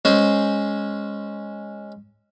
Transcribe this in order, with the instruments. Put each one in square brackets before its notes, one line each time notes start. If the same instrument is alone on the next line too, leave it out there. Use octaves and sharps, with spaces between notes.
[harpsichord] G#3 C#4 C5